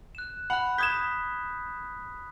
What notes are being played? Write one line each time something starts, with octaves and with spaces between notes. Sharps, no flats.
F#6 E7
F#5 B5 F#6
D#6 G6 G#6 B6 E7